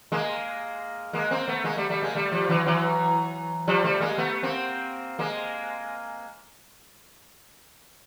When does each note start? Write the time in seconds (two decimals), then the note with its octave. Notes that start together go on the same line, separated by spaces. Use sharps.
0.12 G#3 A#3
1.13 G#3 A#3
1.31 A#3 C4
1.48 A3 B3
1.64 G#3 A#3
1.77 G3 A3
1.90 G3 A3
2.02 G#3 A#3
2.15 G3 A3
2.32 F3 G3
2.49 E3 F#3
2.66 E3 F#3
3.67 F3 G3
3.84 G3 A3
4.01 G#3 A#3
4.18 A3 B3
4.43 A#3 C4
5.19 G#3 A#3